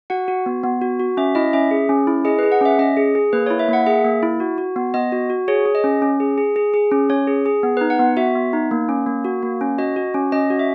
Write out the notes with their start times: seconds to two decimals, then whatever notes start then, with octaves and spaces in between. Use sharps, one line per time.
0.10 F#4 F#5
0.28 F#4
0.46 B3
0.64 B3
0.82 F#4
1.00 F#4
1.17 C#4 E5
1.35 E4 D#5
1.53 C#4 E5
1.71 G#4
1.89 C#4
2.07 E4
2.25 G#4 D#5
2.39 B4
2.43 G#4
2.52 F#5
2.61 C#4 E5
2.79 C#4 D#5
2.97 G#4
3.15 G#4
3.33 A#3 B4
3.46 C#5
3.51 E4
3.59 E5
3.69 A#3 F#5
3.86 G#4 E5
4.04 A#3
4.23 E4
4.40 F#4
4.58 F#4
4.76 B3
4.94 B3 D#5
5.12 F#4
5.30 F#4
5.48 G#4 C#5
5.66 G#4
5.75 D#5
5.84 C#4
6.02 C#4
6.20 G#4
6.38 G#4
6.56 G#4
6.74 G#4
6.91 C#4
7.10 C#4 C#5
7.27 G#4
7.46 G#4
7.63 B3
7.77 B4
7.81 D#4
7.90 F#5
7.99 B3
8.17 F#4 E5
8.35 B3
8.53 D#4
8.71 A#3
8.89 C#4
9.07 A#3
9.25 F#4
9.43 A#3
9.61 C#4
9.78 F#4 D#5
9.96 F#4
10.14 C#4
10.32 C#4 D#5
10.50 F#4
10.59 E5